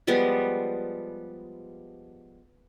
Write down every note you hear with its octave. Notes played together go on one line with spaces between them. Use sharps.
F3 G3 G#3 B3